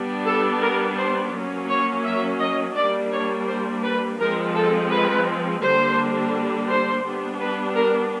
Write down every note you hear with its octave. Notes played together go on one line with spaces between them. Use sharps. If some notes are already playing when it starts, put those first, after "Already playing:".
Already playing: G3 B3 D4
A4
A#4
C5
F#3 A#3 C#4
C#5
E5
D#5
G3 A#3 D4 D5
C#5
C5
B4
F3 G#3 C4 A#4
A4
B4
D3 G3 A#3 D4 C5
C5
G3 B3 D4
B4
A#4